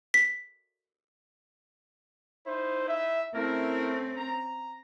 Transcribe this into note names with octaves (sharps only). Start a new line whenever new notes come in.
B6
D#4 E4 C5
E5
A3 C4 C#4 E4 A#4
A#5